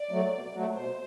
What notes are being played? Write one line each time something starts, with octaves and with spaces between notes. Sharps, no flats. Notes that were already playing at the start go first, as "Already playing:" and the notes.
Already playing: D5
F#3 A3
B2
F#3 A3
B2 C5